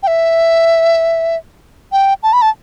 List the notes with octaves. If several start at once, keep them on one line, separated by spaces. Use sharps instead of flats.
G5
E5
G5
A5
B5
A5